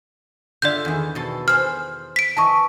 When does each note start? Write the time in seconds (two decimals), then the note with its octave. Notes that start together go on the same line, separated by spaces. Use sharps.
0.62 D3 F4 D5 E5 G6
0.85 E2 D#3
1.15 B2 A4 C6
1.48 G#4 C5 F6
2.16 B6 D7
2.37 E3 D#5 A5 C#6